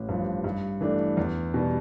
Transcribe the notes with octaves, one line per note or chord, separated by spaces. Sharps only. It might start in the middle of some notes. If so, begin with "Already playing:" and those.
Already playing: A1
G2 F3
G2
E3 A3 D4
E2
B2 G3